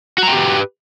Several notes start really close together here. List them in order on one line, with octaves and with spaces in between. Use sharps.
F#4 A#5 G5 G4 B4